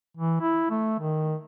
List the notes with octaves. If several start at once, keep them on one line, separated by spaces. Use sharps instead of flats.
E3
E4
A3
D#3